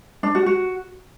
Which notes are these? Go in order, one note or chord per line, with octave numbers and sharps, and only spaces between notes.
D4
F#4
F#4